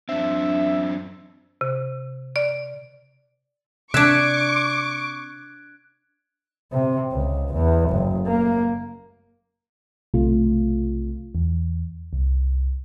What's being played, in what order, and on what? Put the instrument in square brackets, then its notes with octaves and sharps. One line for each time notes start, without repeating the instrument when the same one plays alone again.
[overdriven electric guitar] F#2 C4 [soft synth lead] D4 [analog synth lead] E5
[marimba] C3
D5
[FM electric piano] C3 [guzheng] D4 E5 [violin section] C#6 D6 [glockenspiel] F#6 G#6 D7
[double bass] C3
C#2
E2
F#1
A#3
[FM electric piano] B1 C3 A3 F4
E2
C2